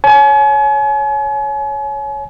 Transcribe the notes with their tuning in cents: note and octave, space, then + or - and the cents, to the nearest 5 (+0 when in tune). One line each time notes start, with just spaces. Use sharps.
C#5 +0 G#5 +40